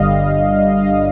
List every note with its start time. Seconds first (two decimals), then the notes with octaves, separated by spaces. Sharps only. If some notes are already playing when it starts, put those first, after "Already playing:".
Already playing: G1 G2 D3 G3 D#5 F5
0.73 D#5 F5